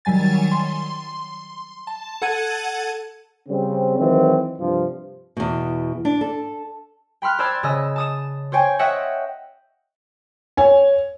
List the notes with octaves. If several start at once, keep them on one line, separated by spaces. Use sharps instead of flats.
D#3 F#3 G3 G#5 A6
C6
A5
A4 F#5 A5 G#6 D#7
C#3 G3 C4
D#3 E3 F#3 G#3 C4
G2 C3 F3
E2 B2
D4
A4
G5 B5 C6 F6 F#6
C5 D5 A5 B5 E6 G#6
C#3 D#5 E6
A5 D#6 E7
C5 C#5 G5 G#5
C#5 D#5 E5 F#5 G5
C#5 G#5